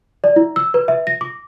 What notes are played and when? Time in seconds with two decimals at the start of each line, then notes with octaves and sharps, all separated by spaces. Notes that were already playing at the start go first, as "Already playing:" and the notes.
0.24 D5
0.36 E4
0.56 E6
0.74 B4
0.88 E5
1.07 A#6
1.21 D6